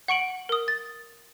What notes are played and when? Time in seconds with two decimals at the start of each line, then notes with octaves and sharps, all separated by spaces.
0.08 F#5 C#6 D7 F#7
0.49 A#4 D#6
0.68 A6